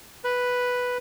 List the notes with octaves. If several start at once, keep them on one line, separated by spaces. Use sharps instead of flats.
B4